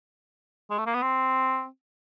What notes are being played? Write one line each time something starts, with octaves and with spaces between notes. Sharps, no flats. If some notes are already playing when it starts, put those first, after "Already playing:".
G#3
A3
A#3
B3
C4